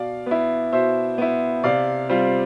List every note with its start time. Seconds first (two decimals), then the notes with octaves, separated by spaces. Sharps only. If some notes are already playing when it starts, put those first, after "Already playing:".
Already playing: B2 D5 F5
0.26 B3 E4
0.72 B2 C5 E5
1.18 B3 E4
1.64 C3 D5 F5
2.09 G3 C4 F4